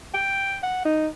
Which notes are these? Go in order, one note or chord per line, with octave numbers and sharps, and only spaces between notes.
G5
F#5
D#4